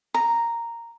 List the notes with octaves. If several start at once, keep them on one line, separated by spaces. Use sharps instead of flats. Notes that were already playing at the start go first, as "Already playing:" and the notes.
A#5